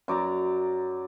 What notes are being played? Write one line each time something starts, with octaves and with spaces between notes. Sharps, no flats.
F#2 D5 A#5